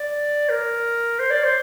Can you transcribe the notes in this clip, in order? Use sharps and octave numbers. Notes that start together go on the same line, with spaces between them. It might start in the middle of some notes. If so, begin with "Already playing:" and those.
Already playing: D5
A#4
C5
D5
C5